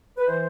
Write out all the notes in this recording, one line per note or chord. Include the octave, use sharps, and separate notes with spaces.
B4
E3 C5